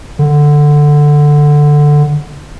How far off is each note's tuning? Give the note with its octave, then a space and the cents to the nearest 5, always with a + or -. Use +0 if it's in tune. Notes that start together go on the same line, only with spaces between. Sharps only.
D3 +5